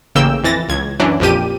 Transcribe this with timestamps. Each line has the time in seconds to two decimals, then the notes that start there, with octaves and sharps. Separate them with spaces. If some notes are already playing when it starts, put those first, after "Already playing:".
0.15 A1 C#3 A#3 G5 E6 G6
0.44 F2 E3 A6 A#6
0.69 C#2 G#6
1.00 F#2 E3 C#4 D4
1.20 A#1 F2 F3 G4 D#7